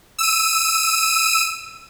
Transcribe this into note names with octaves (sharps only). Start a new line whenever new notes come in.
E6 D#7